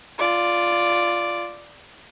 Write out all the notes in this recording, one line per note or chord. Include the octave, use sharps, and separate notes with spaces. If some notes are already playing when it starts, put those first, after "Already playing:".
F4 D5